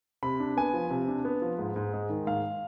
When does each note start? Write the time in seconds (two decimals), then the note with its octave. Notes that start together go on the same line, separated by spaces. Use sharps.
0.23 C3 B5
0.40 D4
0.57 B3 G#5
0.73 F3
0.90 C3
1.08 D4
1.25 B3
1.42 F3
1.59 G#2
1.76 G#2
1.93 G#3
2.10 D#3
2.27 G#2 F5